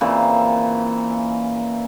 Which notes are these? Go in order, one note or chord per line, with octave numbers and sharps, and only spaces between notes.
A#2 C#3 E3 C4